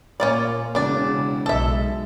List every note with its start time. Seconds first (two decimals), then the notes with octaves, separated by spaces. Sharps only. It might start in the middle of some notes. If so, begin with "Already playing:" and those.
0.20 A#2 A#3 C#4 F4 D5
0.75 E1 C#3 D4 D5
1.46 B1 G#3 A4 E5